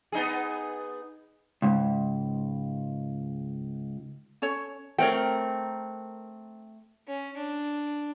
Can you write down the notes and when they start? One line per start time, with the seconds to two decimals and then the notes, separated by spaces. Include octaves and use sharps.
0.12 B3 D#4 G#4
1.62 C#2 G#2
4.42 C#4 A4 C#5
4.98 A3 C4 A#4 C#5 G5
7.07 C#4
7.36 D4